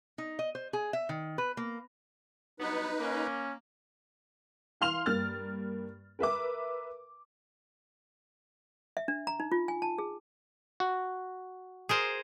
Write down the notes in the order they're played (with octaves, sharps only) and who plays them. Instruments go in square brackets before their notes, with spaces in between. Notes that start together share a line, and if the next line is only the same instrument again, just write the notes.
[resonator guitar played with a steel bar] D#4
D#5
C5
G#4
E5
D#3
B4
A#3
[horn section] G2 F#3 B3 [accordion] D#4 B4
[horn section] A#3 [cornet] C#4
[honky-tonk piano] E3 F5 C6 F6 F7
G2 A#3 F6 A6
A#4 B4 E5 D6
[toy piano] E5
D4
A#5
D#4
F4
G#5
A5
G#4
[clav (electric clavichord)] F#4
[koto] G#4 A#4 C5